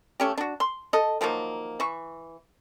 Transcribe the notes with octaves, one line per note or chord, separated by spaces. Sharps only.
A3 C#4 G4
D4 F#4
C6
A4 D#5
D#3 F3 F#3 A#3
E3 C#6